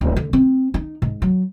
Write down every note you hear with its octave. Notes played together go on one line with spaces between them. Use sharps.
D1
D3
C4
D#4
G#2
F#3